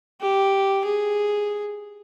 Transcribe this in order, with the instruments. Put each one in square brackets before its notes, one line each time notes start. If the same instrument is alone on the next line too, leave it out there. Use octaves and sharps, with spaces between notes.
[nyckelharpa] G4
G#4